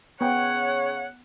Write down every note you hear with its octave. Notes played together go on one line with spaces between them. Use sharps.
C#3 B3 C#5 F#5 G5